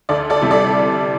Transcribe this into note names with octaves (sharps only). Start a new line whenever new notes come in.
D2 A4 D5
A4 D5
C3 E3 G3
A4 D5